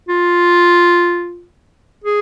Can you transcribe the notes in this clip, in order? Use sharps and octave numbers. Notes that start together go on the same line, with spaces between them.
F4
G#4